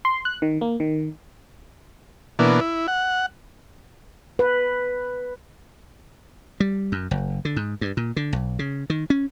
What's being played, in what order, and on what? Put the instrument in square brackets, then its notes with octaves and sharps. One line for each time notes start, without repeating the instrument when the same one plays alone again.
[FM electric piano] C6
F#6
D#3
A#3
D#3
[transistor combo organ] B2 E3 A#3 D4
E4
F#5
[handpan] B4
[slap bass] G3
F#2
F#1
D3
G#2
G2
A#2
D3
B1
C#3
D#3
C#4